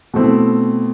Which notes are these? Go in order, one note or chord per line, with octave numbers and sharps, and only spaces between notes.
B2 A3 C4 E4